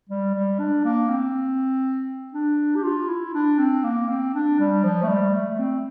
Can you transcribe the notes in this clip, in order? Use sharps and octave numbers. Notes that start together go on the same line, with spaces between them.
G3
G3
D4
A#3
C4
D4
G4
F4
E4
D4
C4
A#3
C4
D4
G3
F3
A3
G3
A3
C4